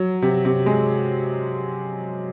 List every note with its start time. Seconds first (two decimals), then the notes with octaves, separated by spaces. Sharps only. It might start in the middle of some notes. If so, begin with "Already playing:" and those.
Already playing: F#3
0.22 C3
0.45 C3
0.66 G#3